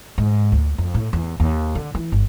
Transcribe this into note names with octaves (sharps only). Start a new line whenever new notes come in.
G#2
D2
F2
A2
E2
D#2
D3
E3
G1